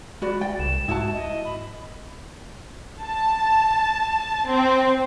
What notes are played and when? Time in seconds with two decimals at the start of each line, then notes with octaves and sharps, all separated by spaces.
0.22 G#3 F#4 D5 B5
0.41 G5 A6
0.59 C2 E7
0.88 G#2 E4 F#4 A5
1.13 D#5
1.45 B5
3.03 A5
4.47 C4